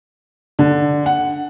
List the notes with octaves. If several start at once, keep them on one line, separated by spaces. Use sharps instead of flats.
D3
F#5